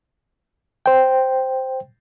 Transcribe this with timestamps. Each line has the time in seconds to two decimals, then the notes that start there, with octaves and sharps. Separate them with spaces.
0.86 C5 G5